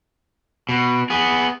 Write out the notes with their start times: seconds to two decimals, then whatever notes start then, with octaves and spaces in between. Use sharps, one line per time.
0.69 B2
1.10 B3 G#4